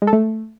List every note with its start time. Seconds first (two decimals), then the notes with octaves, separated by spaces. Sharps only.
0.02 G#3
0.07 A4
0.13 A3